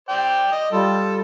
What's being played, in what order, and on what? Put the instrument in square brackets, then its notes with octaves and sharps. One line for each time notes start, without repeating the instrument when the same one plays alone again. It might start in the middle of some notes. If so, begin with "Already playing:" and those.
[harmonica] C5 D5 G5
D#5
[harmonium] G3 F4 [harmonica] A4